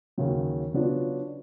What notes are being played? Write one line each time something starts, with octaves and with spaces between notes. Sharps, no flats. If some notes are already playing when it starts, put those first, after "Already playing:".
D#2 C#3 F#3
C#3 F#3 B3 D4 F4